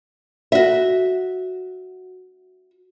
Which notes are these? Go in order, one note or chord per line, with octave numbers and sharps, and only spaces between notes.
F#4 E5